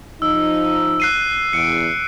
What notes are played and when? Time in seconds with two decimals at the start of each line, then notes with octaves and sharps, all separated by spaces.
0.22 F3 D#4 E6
1.00 F#6 C7 D#7
1.53 E2 C#7 D7